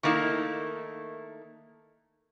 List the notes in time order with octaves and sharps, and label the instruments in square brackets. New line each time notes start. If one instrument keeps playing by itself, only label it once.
[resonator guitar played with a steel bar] D#3 A3 A#3 D#4 E4